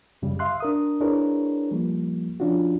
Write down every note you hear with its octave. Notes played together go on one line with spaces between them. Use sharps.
F#2 C#3 G3
E5 F5 C6 F#6
D4 A#4 D#6
D4 E4 G#4 A#4 B4 C#5
F3 G3 A#3
F3 C#4 D4 F4 F#4